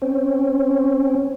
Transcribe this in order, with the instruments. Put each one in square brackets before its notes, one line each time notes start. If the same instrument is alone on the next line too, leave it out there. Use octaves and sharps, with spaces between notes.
[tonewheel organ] C4 C#4